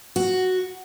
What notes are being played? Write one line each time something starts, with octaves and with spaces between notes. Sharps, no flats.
F#4